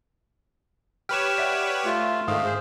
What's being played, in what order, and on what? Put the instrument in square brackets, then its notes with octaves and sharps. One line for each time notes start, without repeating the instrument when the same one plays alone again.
[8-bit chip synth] G4 B4 C#5 [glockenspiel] F6 E7
[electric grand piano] D5 E5 F#5 [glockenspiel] B6
[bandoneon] A3 F4
[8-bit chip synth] G#2 [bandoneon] D3 D#3 A3 [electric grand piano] F5 [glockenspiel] D#6
[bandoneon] G#4 C5